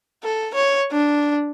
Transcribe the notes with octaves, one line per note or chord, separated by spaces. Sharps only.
A4
C#5
D4